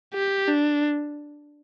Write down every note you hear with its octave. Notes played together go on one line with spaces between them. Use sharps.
G4
D4